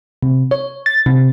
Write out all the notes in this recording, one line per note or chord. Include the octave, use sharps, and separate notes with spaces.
C3
C#5
A6
C3